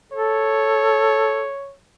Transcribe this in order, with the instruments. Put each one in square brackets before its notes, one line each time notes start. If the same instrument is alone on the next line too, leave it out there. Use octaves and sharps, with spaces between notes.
[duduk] A4 [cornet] C#5